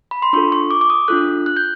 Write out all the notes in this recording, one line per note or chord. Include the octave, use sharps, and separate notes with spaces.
B5
C6
D4 F4 A4 C#6
C#6
D6
D6
D#6
D4 F4 A4 F#6
F#6
G6